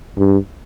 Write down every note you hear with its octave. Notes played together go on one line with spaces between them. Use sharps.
G2